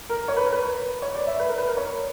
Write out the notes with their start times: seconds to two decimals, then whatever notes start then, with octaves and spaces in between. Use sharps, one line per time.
0.09 A#4
0.28 C#5
0.37 B4
0.45 A#4
0.52 B4
1.02 C#5
1.15 D5
1.27 E5
1.39 B4
1.49 A#4
1.58 B4
1.67 A#4
1.77 C#5